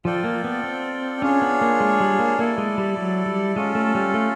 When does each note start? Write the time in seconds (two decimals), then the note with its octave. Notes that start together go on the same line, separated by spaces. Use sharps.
0.05 F3 F4 A4 D5 G5
0.24 A#3
0.44 B3
0.64 C4
1.22 C#4 D4 F4 G#4 C#5
1.42 B3
1.61 A#3
1.80 G#3
2.00 G3
2.19 A#3
2.39 A#3 E4 A4 D5
2.58 G#3
2.78 G3
2.97 F#3
3.26 G3
3.56 G#3 C#4 F4 A4
3.75 A3
3.95 G3
4.14 A3